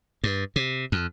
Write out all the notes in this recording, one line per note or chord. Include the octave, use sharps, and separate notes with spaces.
G2
C3
F2